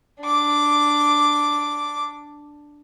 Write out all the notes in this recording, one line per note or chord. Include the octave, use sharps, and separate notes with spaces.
D4 D6